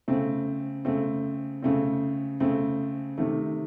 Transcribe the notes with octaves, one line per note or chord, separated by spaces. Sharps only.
C#3 A3 C4
C#3 A3 C4
C#3 A3 C4
C#3 A3 C4
C3 D#3 A3